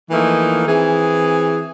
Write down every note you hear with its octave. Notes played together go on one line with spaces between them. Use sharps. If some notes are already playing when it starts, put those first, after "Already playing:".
E3 F3 A3 A#3 D#4
E3 C4 G#4